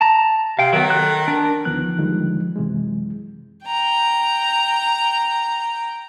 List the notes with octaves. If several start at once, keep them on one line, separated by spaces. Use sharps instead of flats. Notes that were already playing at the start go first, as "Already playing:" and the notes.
A5 A#5
C3 F5 G5
D#3 F#3 B3
A4 F#6
D4 A#4
D2 D#3 F3 B3 F#6
E2 D3 D#3 F3 G3 G#3
F#2 C3 E3 G#3
G5 A#5